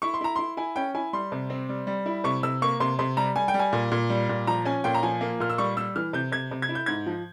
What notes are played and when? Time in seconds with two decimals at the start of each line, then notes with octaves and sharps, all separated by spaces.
0.02 E4 C#6
0.14 C6
0.21 E4 A#5
0.36 E4 C6
0.57 E4 G#5
0.76 C#4 G5
0.95 E4 G#5
1.13 G3 C6
1.32 C3
1.50 C4
1.69 G3
1.87 G3
2.06 E4
2.24 C3 C#6
2.43 C3 E6
2.62 A#3 C#6
2.80 C3 C6
2.99 C3 C6
3.17 G3 A#5
3.36 G3 G#5
3.48 G5
3.54 G3
3.59 G#5
3.73 A#2
3.92 A#2
4.10 G3
4.29 A#2
4.47 F3 A#5
4.65 C#4 G#5
4.84 A#2 G5
4.95 A#5
5.03 F3 G#5
5.21 A#3
5.40 A#2 F6
5.50 E6
5.58 G3 C#6
5.77 G3 E6
5.96 E3 F6
6.13 C3 G6
6.32 C3 G#6
6.51 C3
6.62 G#6
6.69 E4
6.75 G6
6.86 G#2 G#6
7.06 F3